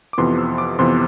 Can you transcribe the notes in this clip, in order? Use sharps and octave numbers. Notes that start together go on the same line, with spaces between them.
D6
F2 C3 E3 B3 C6
E6
D6
F2 C3 E3 B3 C6